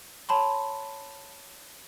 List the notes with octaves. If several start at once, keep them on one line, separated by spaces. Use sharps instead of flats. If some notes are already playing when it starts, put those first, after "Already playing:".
C#5 A5 B5 C6